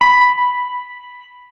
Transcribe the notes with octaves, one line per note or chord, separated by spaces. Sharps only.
B5